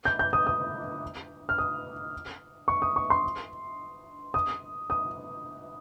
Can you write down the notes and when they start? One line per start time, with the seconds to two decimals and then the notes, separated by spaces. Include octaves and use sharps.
0.05 G6
0.19 G6
0.33 D#6
0.47 D#6
1.49 F6
1.58 D#6
2.68 C#6
2.82 D#6
2.96 C#6
3.10 C6
4.34 D#6
4.90 D#6